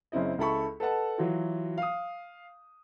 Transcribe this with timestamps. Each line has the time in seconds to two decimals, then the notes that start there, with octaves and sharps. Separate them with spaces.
0.12 F#1 C#3 C4 E4 D#5
0.38 C#2 E4 A4 B5 C#6
0.80 A4 B4 D#5 F#5 A5
1.18 E3 F#3 F4 F#4
1.78 F5 D#6